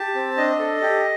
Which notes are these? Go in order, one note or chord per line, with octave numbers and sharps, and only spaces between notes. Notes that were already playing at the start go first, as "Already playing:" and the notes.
Already playing: G4 A5
C4
D4 D#5
A4
G4